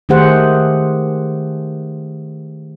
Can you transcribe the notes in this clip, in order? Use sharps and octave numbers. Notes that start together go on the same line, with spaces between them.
D#3 A3 G4 G#4 C5 F#5